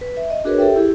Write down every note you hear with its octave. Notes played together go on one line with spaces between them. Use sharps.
B4
E5
D#5
D4 F#4 G#4 A#4 B4 C#5
G4 A4 E5 G5
E4 G4 G#4